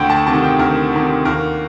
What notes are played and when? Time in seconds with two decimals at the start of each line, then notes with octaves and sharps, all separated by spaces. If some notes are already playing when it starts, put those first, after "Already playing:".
Already playing: D2 G5
0.10 A5
0.27 C3 D#3 A5
0.43 G5
0.59 D2 A#4
0.92 C3 D#3
1.25 D#2 A#4